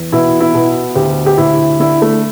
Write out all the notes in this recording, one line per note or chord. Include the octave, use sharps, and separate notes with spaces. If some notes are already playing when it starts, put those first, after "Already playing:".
Already playing: E2
B2 E4
E4
B2
D2 G4
G4
D2 E4
D3 E4
A3